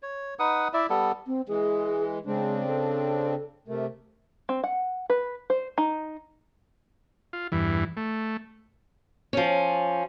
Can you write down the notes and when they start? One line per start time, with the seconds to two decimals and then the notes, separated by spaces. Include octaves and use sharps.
0.03 C#5
0.39 D#4 B4 F#5 D#6
0.73 E4 D5 E5
0.90 G3 B3 A4
1.27 C4
1.48 E3 G#3 G#4
2.26 C#3 G#3 C4 D4
2.67 A4
3.68 C3 A3 A#4
4.49 C4
4.64 F#5
5.10 B4
5.50 C5
5.78 D#4
7.33 F4
7.52 E2 G2 E3
7.97 A3
9.33 F3 C#4